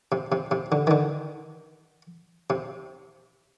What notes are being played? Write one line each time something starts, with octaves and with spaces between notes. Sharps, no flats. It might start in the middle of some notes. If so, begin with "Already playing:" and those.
C3
C3
C3
D3
D#3
D3
C3